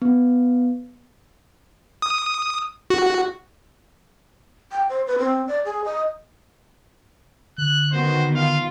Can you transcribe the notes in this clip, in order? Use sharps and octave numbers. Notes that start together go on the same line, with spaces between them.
B3
D#6
F#4
G5
C5
B4
C4
D5
G#4
D#5
D3 F#6
D#3 B3 F#4 C5
F4 F5